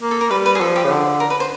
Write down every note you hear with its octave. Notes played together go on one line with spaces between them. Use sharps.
A#3
A4
A#4
G3 B4
B4
G#4
F3 A4
G4
C#3
D3
A#4
B4
C5